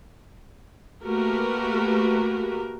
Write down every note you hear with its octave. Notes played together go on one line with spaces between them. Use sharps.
A3 A#3 F#4 G4 A#4 B4